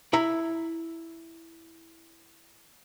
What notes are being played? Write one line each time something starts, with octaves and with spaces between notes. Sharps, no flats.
E4 A#5